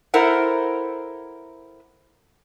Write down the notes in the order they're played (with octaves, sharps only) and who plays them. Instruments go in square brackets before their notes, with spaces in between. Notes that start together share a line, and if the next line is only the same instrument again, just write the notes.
[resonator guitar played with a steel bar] E4 A4 A#4 C5 F#5